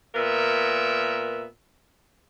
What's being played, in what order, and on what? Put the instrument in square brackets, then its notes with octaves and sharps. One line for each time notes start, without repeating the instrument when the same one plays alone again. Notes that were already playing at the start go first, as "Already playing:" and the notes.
[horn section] A#2 B3 A#4 E5